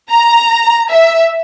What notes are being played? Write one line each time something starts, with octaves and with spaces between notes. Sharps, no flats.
A#5
E5